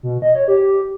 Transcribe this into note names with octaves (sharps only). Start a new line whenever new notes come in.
B2
D#5
C#5
G4